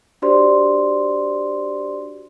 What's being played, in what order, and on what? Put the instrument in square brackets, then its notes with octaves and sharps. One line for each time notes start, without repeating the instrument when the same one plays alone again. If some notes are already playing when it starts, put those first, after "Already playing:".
[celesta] D4 F#4 G4 C5 D5 C6